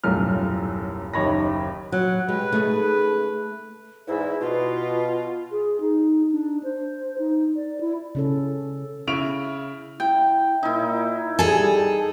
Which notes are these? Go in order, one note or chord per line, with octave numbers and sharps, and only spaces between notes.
D#1 B1 F#2 A2 F4 F6
F#1 D#2 D#4 C#5 B5 A#6
F#3 F#5
G#3 G4 B4
C#3 A3 D#4 G#4
E2 G#2 E4
B2 F4
G#4
D#4
D4
C5
D#4
D5
E4
C#3 C#4 A4
C#3 E4 C#6 F6 D7 F7
E4 G5
A#2 D#4 E4
G3 G#4 A4 G#5